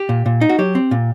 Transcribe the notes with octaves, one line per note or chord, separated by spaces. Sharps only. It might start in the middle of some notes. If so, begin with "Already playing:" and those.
Already playing: G4
A#2
A#2
D#4
F#4
F#3 G4
C4
A#2